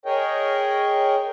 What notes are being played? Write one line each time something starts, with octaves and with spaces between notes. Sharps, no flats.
G#4 A#4 C#5 D#5 G5